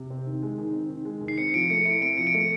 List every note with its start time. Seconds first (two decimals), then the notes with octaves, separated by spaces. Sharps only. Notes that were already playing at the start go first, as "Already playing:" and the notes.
Already playing: C3
0.10 C4
0.26 D#3
0.42 G#3
0.58 D#3
0.73 C4
0.89 D#3
1.05 G#3
1.21 D#3
1.28 C7
1.38 C4 C#7
1.54 F3 D7
1.70 A3 C#7
1.85 E4 D7
2.01 C4 D7
2.18 F3 C#7
2.27 D7
2.34 A3 C#7